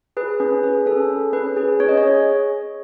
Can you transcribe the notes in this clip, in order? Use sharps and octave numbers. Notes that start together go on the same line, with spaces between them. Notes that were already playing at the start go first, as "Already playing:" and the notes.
G#4 B4
C#4 B4
G#4
C#4 A4
G#4
C#4 B4
G#4
C#4 C#5
D#5
C#5
G#4